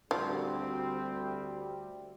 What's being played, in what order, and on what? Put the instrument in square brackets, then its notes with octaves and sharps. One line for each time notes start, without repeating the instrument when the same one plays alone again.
[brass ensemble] D2 G3 [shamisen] F3 [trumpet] C4 [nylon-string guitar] D4 F#4